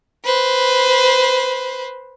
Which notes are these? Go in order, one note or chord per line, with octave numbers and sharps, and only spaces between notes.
B4 C5